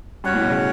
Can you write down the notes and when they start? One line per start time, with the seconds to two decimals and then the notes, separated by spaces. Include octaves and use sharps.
0.24 G2 C#4 F#4 C#5 F#5
0.34 A2
0.41 B2
0.50 C#3